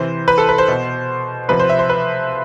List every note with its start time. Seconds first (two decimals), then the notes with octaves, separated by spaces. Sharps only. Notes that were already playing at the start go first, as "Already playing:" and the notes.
Already playing: C3 E3 C5
0.28 B4
0.38 A4
0.49 B4
0.58 C5
0.68 B2
1.48 C3 F3 B4
1.59 C5
1.70 E5
1.79 C5
1.89 B4